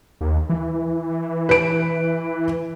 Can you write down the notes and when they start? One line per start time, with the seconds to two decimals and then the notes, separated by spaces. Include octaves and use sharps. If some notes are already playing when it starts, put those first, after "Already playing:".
0.21 D#2
0.49 E3
1.49 B4 D7